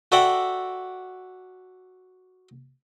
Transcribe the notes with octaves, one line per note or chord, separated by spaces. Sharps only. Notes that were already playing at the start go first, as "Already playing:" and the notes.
F#4 A4 D5 E5 F#5 G5